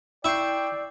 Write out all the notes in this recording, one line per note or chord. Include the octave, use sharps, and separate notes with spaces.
E4 D5 G5 C#6 E6 G6 C7